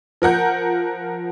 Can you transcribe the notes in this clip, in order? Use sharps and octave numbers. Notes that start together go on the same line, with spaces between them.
F3 A#4 F#5 G6